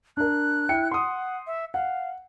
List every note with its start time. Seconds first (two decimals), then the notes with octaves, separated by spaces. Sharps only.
0.17 D4 A#4 F#6
0.69 E4 G5 C#7
0.91 F#5 C6 D#6
1.47 E5
1.74 F5 F#5